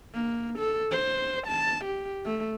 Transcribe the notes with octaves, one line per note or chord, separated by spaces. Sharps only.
A#3
A4
C5
A5
G4
A3